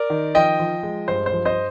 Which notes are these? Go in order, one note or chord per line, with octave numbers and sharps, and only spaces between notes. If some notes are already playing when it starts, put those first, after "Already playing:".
Already playing: A#4 D5
D#3
F3 D#5 G5
F3
G#3
G2 C5
C5
F3
C5 D#5